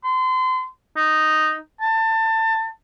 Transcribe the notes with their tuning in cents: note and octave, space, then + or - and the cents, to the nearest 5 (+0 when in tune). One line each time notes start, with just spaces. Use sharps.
C6 -35
D#4 -5
A5 +25